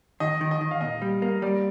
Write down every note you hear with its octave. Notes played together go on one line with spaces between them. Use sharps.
D#3 D#5
D#3
D#5
D#3
F5
A#2 D#5
G3
A#3
G3 D5